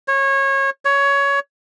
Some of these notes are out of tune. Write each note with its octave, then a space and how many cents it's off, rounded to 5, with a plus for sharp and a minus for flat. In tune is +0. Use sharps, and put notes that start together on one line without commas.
C#5 -25
C#5 +15